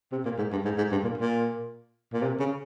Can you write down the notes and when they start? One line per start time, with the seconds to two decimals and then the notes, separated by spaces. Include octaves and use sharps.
0.12 C3
0.25 A#2
0.38 G#2
0.52 G2
0.65 G#2
0.77 G#2
0.91 G2
1.04 A#2
1.18 A#2
2.13 A#2
2.22 C3
2.39 C#3